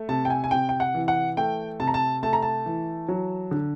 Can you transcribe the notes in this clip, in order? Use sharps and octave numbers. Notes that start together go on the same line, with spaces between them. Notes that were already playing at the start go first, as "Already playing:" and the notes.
Already playing: A3
C3 A5
G5
G#5
G#5
C3 G5
G5
F#5
E3
F#5
A3 G5
C3 A5
A#5
A5
A3 A5
A#5
A5
E3
F#3
D3